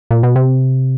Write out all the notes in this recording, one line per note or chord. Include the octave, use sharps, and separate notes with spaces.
A#2
B2
C3